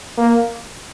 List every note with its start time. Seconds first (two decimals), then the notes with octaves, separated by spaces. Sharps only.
0.18 A#3